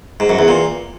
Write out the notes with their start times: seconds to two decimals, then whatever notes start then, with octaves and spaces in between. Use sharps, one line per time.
0.20 G#2
0.29 F#2
0.39 E2
0.48 A#2